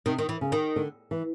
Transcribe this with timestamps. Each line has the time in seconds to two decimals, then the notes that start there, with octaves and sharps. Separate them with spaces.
0.06 C3 D#3
0.18 D#3
0.29 E3
0.41 C#3
0.52 D#3
0.76 D3
1.11 E3